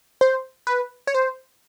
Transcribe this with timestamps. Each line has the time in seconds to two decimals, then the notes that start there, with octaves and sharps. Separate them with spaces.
0.21 C5
0.67 B4
1.07 C#5
1.14 C5